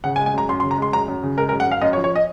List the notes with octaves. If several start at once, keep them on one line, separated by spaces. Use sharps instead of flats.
C#3 F#5
G#5
G#3
G#5
F#2 A#5
F#2 C6
C6
C#3
A#5
G#3 C6
F#2 A#5
F#2
C#3
G#3 A#4
A#4
F#2
F#5
F#2 F5
F#2 D#5
C#5
F3
C#5
D#5